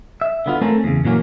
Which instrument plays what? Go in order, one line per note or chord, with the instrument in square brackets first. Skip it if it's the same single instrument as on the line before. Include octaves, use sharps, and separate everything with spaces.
[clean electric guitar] E5
D3 B3 F4
A3 C4 C#4 A4 A#4
E2 C#3
A#2 E3 F#3 A#3 C#4